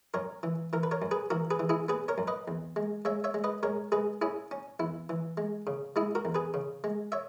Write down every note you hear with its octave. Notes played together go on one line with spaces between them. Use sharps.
F#2 A#4 C#5
E3
E3 A#4
B4
A#4 C#5
F#2
G#4 B4
E3 F#4 A#4
G#4 B4
E3
E4 G#4
B3 G#4 B4
A#4 C#5
F#2
B4 D#5
E2
G#3
G#3 C#5 E5
C#5 E5
G#3
B4 D#5
G#3 A#4 C#5
G#3 G#4 B4
C#4 E4 G#4
C#4
E2 E4
E3
G#3
C#3
G#3 E4 G#4
F#4 A#4
E2
G#4 B4
C#3
G#3
C#5 E5